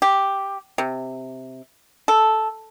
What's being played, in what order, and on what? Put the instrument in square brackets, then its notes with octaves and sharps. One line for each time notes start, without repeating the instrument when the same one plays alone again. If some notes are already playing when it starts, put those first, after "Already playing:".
[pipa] G4
C3
A4